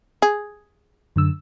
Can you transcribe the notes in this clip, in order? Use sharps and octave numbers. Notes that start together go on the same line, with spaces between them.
G#4
F#2 D3 E6